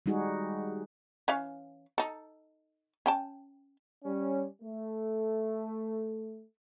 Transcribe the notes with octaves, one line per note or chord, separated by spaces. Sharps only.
G3 G#3 D#4 F#4 G#4
E3 C#4 F5
D#4 A4
C#4 G5 A5
G3 C#4
A3